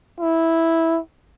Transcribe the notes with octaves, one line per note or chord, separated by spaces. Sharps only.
E4